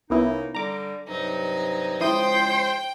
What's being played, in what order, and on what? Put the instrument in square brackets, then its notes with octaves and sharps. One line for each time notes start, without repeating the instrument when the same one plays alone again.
[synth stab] C2 B3 E4 [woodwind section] A#3 C#4 D#4
[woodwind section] D3 G3 [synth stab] A#5 D6
[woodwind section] G2 C3 F#3 [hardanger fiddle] D#4
[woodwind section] C#3 F3 G#3 [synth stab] E4 D#6 D#7 [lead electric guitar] C5 [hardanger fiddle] G5